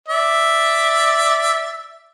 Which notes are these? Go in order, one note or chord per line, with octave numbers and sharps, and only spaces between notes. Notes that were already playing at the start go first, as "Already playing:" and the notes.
D5 E5